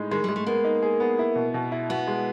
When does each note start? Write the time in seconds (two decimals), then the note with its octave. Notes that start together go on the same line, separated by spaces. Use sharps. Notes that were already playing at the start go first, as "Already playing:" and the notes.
Already playing: A2 G#3 D#4
0.11 D#3 G#3
0.24 G3
0.29 G#3
0.36 A3
0.46 A#3 B3
0.64 D#4
0.82 G#4
1.00 B3
1.19 E4
1.36 B2
1.54 B2
1.72 E4
1.90 B3 F#4
2.07 G#3